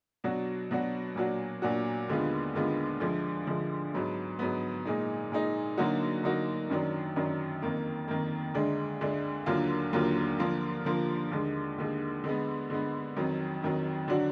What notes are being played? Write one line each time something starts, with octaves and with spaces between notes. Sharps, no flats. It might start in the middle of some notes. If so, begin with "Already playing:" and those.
B2 F#3 D4 F#4
B2 F#3 D4 F#4
A#2 F#3 D4 F#4
A#2 F#3 D4 F#4
D#2 D3 G#3 B3 F4
D#2 D3 G#3 B3 F4
D2 D3 F3 G#3
D2 D3 F3 G#3
G#2 F#3 B3
G#2 F#3 B3
A#2 G#3 D#4
A#2 G#3 D#4
D3 F#3 A#3 D#4 F#4
D3 F#3 A#3 D#4 F#4
F#2 D#3 F#3 D4
F#2 D#3 F#3 D4
F2 D#3 A#3
F2 D#3 A#3
D2 D3 G#3 D4
D2 D3 G#3 D4
D#2 D3 F#3 A#3 F4
D#2 D3 F#3 A#3 F4
D3 F3 A#3 F4
D3 F3 A#3 F4
D#2 D3 G#3
D#2 D3 G#3
D3 G#3 B3
D3 G#3 B3
F2 D#3 F#3
F2 D#3 F#3
D3 F#3 D4 F#4